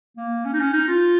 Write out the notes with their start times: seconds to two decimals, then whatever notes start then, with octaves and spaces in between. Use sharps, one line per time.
0.17 A#3
0.45 C#4
0.53 D#4
0.60 C#4
0.73 D#4
0.88 F4